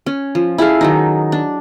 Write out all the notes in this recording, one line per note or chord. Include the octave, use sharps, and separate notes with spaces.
C#4
F3
E4 G#4 A4 F5
D#3 F#3 D#4
D4